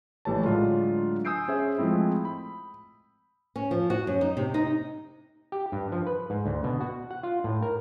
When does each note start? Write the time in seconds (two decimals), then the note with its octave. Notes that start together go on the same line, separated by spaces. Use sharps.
0.25 A#1 E3 A3 G4 C#5 A5
0.43 A2 D3 F#3 G#3 D4 F4
1.25 G#5 D#6 E6 G6 C7 D7
1.48 C#4 G#4 C5 E5
1.78 F3 G#3 A3 C4 E4
2.25 B5
3.56 C#4
3.71 F3
3.90 F#4
4.07 F#2
4.21 D#4
4.37 C3
4.54 D#4
5.52 G4
5.72 G2
5.92 F3
6.07 B4
6.30 G#2
6.46 D2
6.64 B2
6.81 F#4
7.11 F#5
7.23 F4
7.44 A2
7.63 A#4